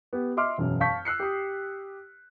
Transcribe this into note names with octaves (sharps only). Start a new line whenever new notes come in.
B3 G4
D#5 E5 C6 D6 F6
E1 F#2
F5 A5 C#6 G6 B6
E6 F#6 C7 C#7
G4 D#6